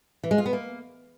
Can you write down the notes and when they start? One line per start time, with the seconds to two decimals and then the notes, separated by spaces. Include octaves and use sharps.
0.23 E3
0.31 G#3
0.38 F4
0.46 B3
0.53 A#3